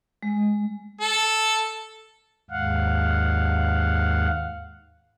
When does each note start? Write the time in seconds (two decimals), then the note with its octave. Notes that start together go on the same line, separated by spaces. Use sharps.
0.23 G#3
1.01 A4
2.51 D#2 G#2 F5 F#5